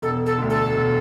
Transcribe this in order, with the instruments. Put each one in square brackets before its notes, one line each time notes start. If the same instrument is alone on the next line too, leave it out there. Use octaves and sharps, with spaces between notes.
[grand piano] E1 [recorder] A4
[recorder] A4
[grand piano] D2 D3
[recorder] A4
[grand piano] E1